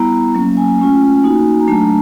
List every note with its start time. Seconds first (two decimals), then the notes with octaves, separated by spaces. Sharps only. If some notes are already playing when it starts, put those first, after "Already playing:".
Already playing: G3 B3 E4 A#5
0.35 F#3 A#3 C#4
0.57 G#5
0.79 A3 C#4 F4
1.23 A#3 D#4 F#4
1.61 A#5
1.67 F#3 A3 D4 A5